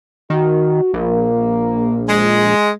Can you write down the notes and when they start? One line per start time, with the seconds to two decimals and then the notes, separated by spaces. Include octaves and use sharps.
0.30 D#3 F#4
0.94 A#1 A#3
2.08 G#3